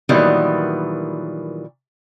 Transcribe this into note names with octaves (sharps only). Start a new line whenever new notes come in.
A#2 D#3 E3 F#3 G3 B3